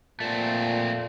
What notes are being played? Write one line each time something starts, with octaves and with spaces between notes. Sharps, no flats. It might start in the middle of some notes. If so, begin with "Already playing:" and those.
A#2 A3 C4